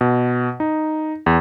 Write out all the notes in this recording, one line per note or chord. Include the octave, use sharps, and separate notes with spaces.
B2
D#4
E2